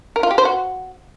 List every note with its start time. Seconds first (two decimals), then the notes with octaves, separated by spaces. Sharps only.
0.16 A#4
0.23 F4
0.31 G4
0.38 C5
0.45 F#4